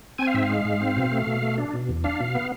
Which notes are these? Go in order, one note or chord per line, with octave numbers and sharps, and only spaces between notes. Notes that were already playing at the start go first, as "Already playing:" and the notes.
C4 G#5
F5
G#2 E5
F5
G#3
G#2
C4
B2
A3
B2
A3
D4
B2
E2
D4 F5
B2
B3